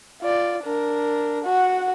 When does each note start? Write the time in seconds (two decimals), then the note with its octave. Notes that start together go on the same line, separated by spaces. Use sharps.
0.22 F4 D5
0.64 D4 A#4
1.45 F#4 F#5